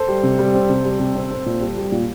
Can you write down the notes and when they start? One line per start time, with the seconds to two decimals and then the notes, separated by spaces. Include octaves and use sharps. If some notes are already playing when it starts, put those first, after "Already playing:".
Already playing: A4 C5
0.08 G3
0.23 C3
0.39 G3
0.54 C4
0.69 C3
0.85 G3
1.00 C3
1.15 C4
1.31 C4
1.46 A#2
1.61 G3
1.77 G3
1.92 A#2